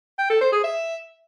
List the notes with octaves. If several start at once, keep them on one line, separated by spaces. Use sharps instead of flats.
G5
A4
C5
G#4
E5